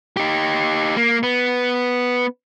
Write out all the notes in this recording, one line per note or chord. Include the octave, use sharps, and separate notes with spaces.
D#4 G4
A#3
B3